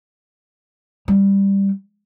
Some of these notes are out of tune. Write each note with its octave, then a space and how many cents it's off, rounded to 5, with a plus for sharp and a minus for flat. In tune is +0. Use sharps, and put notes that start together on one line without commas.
G3 +10